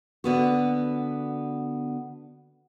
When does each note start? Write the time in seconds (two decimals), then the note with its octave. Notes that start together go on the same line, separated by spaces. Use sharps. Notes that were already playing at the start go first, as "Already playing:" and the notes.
0.24 D3 B3 F#4